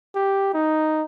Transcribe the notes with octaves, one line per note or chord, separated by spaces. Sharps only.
G4
D#4